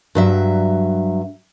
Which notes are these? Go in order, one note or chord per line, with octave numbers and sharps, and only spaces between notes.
G2 F#3 E5